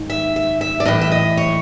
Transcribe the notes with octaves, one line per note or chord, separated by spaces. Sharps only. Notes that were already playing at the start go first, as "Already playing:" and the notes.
Already playing: G#2 D#3
E5
E5
E5
D5
A2 E3 D#5
E5
D#5
C#5